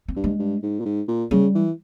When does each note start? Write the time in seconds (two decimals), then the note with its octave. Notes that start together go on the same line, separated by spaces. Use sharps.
0.08 C4
0.16 G2
0.24 G#3
0.39 G2
0.63 G#2
0.80 A#2
0.85 G#2
1.08 A#2
1.31 C#3 G3
1.55 E3